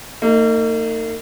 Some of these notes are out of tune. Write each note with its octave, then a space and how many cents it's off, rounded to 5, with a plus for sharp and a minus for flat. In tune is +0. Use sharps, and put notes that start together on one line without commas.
A#3 -45 D#4 +0